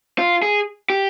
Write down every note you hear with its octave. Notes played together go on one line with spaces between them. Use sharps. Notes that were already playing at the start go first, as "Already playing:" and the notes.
F4
G#4
G4